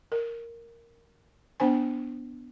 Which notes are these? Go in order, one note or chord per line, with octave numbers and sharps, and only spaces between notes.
A#4
B3 D4 C5 G#5